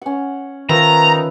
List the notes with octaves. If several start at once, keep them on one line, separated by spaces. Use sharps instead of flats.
C#4 F#5
D#3 F3 B4 E5 A#5